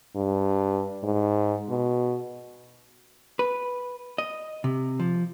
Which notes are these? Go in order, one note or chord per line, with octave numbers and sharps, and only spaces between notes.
G2
G#2
B2
B4
D#5
C3
F3